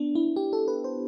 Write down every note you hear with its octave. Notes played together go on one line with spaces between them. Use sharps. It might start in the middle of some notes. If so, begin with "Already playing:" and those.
Already playing: B3 D4
E4
G4
A4
B4
C5